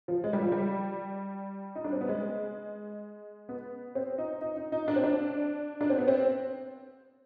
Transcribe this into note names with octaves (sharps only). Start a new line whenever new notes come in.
F3
G#3
G3
F3
G3
D#4
D4
C4
B3
G#3
B3
C4
D#4
D#4
D#4
D#4
D4
C4
D4
D4
C4
B3
C4